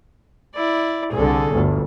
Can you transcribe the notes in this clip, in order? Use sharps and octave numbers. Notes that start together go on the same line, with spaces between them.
E4 D5
C2 D3 G#4 A4
G1 D2